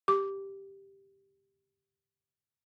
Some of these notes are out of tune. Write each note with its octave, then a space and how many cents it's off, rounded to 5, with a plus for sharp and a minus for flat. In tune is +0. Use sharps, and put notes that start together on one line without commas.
G4 +0 D6 -15